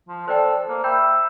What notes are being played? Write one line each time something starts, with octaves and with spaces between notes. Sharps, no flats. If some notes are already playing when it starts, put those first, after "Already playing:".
F3
A4 C5 D5 G5
A#3 C5
E5 G5 B5 G6